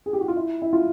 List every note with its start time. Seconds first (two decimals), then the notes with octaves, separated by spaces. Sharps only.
0.06 G#4
0.13 G4
0.21 F#4
0.28 F4
0.36 E4
0.62 E4
0.73 F4